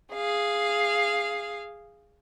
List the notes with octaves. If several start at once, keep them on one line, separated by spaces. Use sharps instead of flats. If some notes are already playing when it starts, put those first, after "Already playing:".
G#4 F5